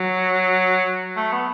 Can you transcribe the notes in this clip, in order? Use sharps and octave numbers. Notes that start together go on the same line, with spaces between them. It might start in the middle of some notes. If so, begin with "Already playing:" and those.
Already playing: F#3
A3
B3